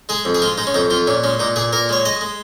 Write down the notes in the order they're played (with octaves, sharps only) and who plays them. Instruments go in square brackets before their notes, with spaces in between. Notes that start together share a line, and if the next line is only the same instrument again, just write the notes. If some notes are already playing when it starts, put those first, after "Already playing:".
[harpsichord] G#3 G#4
F2
G#4
G#3 F4
G#3 D#4
C#4
F2 D#4
F2 F4
A#2 C#4
G#3 C#4
A#2 D#4
A#2 G#4
A#2 A#4
G#3 C#5
G#3 D#5
G#3